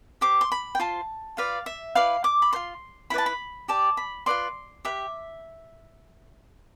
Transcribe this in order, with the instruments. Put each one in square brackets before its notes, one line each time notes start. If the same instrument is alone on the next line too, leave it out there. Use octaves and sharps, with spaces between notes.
[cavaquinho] G4 C5 D6
C6
B5
G5
F4 C5 A5
F4 B4 D5 F5
E5
E4 B4 D5 F5
D6
B5
C5 C6
F4
E4 B4 D5 B5
A5
B5
G4 D5 A5
B5
F4 B4 D5 C6
G4 B4 E5